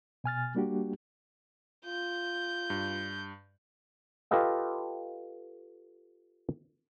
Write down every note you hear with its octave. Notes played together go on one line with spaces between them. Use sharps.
B2 G#5 F6 A6
G3 A#3 D4 F#4 G4
F4 G6
G2
F4 G4 A4 B4 D#5 F5